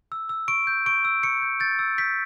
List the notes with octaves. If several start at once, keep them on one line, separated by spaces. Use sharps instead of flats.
E6
E6
C#6 D7
G6
C#6 D7
E6
C#6 C#7
G6
G6 A6
E6
G6 B6